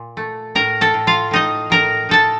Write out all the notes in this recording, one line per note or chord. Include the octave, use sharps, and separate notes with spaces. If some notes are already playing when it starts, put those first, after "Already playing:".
Already playing: A#2
A3
A2 A#4 A#5
A4 A5
A2
F4 F5
A2 D#4 D#5
A2 A#4 A#5
D#4 A4 A5